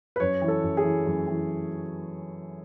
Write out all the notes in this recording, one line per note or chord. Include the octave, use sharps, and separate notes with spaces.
B4
F#2 C#5
E3
A4
F#2
G#4
E3
F#2
E3